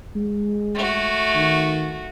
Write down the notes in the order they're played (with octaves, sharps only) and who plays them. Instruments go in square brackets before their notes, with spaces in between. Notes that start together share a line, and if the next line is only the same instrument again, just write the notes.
[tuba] G#3
[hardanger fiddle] A3 F#4
[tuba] D#3